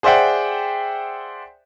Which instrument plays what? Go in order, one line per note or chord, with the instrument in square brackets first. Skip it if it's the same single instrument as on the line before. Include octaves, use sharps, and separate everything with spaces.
[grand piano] G#4 C5 D5 E5 F#5 G5